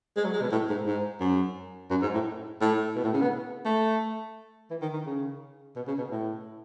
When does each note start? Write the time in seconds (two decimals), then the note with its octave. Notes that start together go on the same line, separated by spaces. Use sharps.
0.17 G#3
0.24 F#3
0.33 G#3
0.42 B2
0.52 A2
0.69 G#2
0.86 G#2
1.20 F#2
1.90 F#2
2.02 G#2
2.14 A2
2.61 A2
2.95 B2
3.04 A2
3.13 C#3
3.22 B3
3.65 A3
4.70 E3
4.82 D#3
4.93 D#3
5.06 C#3
5.76 B2
5.87 C#3
5.98 B2
6.11 A2